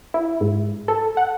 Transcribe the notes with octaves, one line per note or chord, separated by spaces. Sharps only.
E4
G#2
A4
F#5